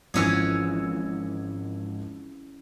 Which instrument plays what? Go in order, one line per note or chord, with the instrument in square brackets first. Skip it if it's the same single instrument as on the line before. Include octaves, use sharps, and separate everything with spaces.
[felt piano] G#1 F3 E6 [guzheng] E3 C#4 G#4